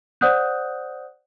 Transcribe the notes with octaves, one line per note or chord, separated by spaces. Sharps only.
C5 D5 F#5 D#6 F#6 G6